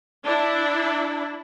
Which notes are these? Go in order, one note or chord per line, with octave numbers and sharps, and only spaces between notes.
D4 E4